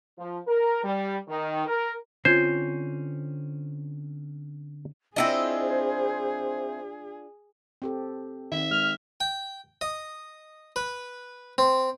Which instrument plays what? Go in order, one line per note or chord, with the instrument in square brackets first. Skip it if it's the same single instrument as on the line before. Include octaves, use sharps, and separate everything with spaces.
[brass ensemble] F3
A#4
G3
D#3
A#4
[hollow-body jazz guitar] D3 C4 C#4 [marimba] F4 G#6 [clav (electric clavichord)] C5
[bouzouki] C4 E4 D#5 [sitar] D4 F4 [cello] G#4 [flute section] C5
[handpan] C4 G4 A4
[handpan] D#3 C4 [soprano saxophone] E5
[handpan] G#3 [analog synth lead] F6
[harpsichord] G5
D#5
B4
C4